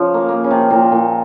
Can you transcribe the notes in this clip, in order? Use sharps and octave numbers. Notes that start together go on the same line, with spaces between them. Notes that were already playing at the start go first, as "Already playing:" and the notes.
Already playing: C#3 F3
A#3
A#3
C#3
C3
A#2
A#2